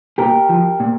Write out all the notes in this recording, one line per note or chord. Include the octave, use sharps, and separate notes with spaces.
A#2 G4 A#4
F3
A#2